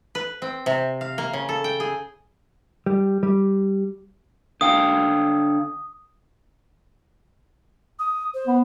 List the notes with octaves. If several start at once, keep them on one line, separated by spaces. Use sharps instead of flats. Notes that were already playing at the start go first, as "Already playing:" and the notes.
B4
C4
C3
F5
A#3
C#3
A4
G5
G#4
G3
G3
D3 F5 G5 D#6
D#6
C5
B3